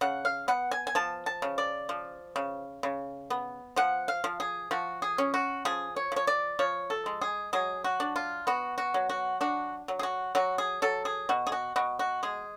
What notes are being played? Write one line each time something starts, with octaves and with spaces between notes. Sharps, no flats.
C#3 F#5
F5
B3 F#5
G#5
G#5
F3 A5
A5
C#3
D5
F3
C#3
C#3
B3
F3 F#5
F5
F3
G#4
F3 F#4
G#4
C#4
F#4
F3 G#4
C#5
F3 C#5
D5
F3 C#5
A4
G#3
G#4
F#3 G#4
F#4
D4
F4
B3 F#4
F#4
F#3
F#4
D4 F#4
F#3
G#4
F#4
F#3 F#4
G#4
F#3 A4
G#4
B2 F#4
G#4
F#4
B2 F#4
F#4
G#3 G#4